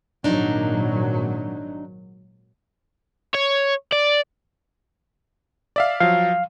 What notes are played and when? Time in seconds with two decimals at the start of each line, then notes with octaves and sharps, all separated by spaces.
0.24 G#1 A#2 F#3 D4 D#4
3.34 C#5
3.93 D5
5.76 D5 E5 F5
6.00 F3 F#3 F5